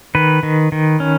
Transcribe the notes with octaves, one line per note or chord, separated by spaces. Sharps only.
D#3 B4
D#3
D#3
C#4